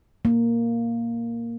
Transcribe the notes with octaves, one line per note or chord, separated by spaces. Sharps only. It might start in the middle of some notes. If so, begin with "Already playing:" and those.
A#3